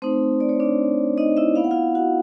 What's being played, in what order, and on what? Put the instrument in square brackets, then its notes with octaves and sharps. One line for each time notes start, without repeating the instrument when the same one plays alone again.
[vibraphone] A3 C4 D#4 C5
D5
C#5
D4 D5
D#4 D#5
E4 E5
B3 E4 F5
F#5
F4 F5
F#4 F#5